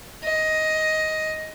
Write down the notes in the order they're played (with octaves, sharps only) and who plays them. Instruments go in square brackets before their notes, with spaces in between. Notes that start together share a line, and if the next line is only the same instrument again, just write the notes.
[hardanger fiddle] D#5